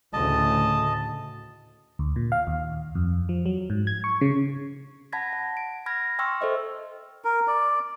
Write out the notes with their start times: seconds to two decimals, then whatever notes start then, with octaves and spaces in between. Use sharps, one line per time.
0.13 D2 A2 C#3 D#5 A5
1.99 D2
2.16 A#2
2.32 F5
2.47 D#2
2.95 F2
3.29 F3
3.46 F#3
3.70 G#2
3.87 G#6
4.04 C#6
4.21 C#3
5.12 F#5 A5 B5 G#6 A#6 B6
5.33 F#5
5.57 D7
5.86 B5 F6 G#6 A#6
6.19 G5 C6 C#6 E6 F6
6.41 A4 C5 D#5 E5
7.24 A#4
7.47 D5